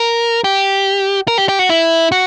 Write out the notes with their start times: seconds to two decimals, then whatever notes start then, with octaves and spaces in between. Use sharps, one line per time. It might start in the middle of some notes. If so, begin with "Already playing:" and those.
Already playing: A#4
0.44 G4
1.28 A#4
1.38 G4
1.49 G4
1.59 F#4
1.69 E4
2.12 F#4